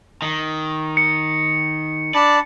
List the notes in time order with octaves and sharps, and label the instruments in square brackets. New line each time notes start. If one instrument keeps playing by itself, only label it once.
[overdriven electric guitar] D#3
[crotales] C#7
[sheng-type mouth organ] D4 A5 B5 [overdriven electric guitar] D5